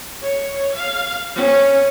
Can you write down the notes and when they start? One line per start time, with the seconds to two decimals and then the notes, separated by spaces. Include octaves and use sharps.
0.21 C#5
0.74 F5
1.35 C#4